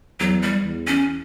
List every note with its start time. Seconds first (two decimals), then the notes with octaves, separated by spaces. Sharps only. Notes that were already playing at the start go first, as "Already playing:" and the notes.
0.20 E2 F#3
0.42 G3
0.65 E2
0.87 C#4